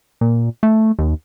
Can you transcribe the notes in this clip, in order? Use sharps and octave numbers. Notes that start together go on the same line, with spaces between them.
A#2
A3
D#2